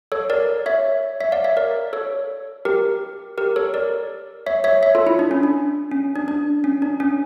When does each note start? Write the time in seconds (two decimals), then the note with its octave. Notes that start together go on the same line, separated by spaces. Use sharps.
0.12 A4 C#5
0.30 A#4 D5
0.66 C#5 E5
1.20 C#5 E5
1.32 D5 F5
1.44 C#5 E5
1.57 A#4 D5
1.93 A4 C#5
2.65 G4 A#4
3.38 G4 A#4
3.56 A4 C#5
3.74 A#4 D5
4.46 C#5 E5
4.64 C#5 E5
4.83 C#5 E5
4.95 F4 A4
5.07 E4
5.19 D4
5.31 C#4
5.43 D4
5.91 C#4
6.16 D4
6.28 D4
6.64 C#4
6.82 D4
7.00 C#4